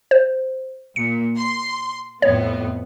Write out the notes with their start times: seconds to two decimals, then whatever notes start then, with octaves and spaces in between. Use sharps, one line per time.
0.11 C5
0.96 A#2 C#7
1.38 C6
2.22 F2 A2 B3 C#5